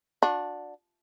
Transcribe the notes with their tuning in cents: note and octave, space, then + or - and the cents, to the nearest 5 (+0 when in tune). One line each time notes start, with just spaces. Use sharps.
D4 +0 F#4 -40